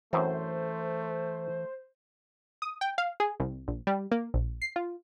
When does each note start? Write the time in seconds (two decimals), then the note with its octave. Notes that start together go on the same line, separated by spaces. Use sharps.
0.13 F#2 A2 E3 A3 C4 C5
2.62 D#6
2.81 G5
2.98 F5
3.20 G#4
3.40 C2
3.68 A#1
3.87 G3
4.11 A#3
4.34 A#1
4.62 C7
4.76 F4